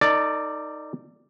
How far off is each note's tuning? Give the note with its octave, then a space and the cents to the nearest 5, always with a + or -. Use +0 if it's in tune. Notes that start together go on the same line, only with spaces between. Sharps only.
D#4 +0 A4 +45 D5 +0